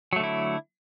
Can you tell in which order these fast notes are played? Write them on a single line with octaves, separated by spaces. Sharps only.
F#3 A3 D3 E4